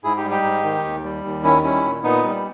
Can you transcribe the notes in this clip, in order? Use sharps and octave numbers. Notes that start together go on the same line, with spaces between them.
G#2 E4 G#4
D#4 G4
G3
D#4 G4
G#2
D#3
D#2
G3
D#2
D#3 C#4 E4
G3 C#4 E4
A#2
A#2 B3 D#4
G3